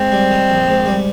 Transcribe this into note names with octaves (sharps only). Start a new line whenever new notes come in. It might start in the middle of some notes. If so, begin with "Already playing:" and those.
Already playing: G#2 C4
G3
D#3
A#1
G#2
G3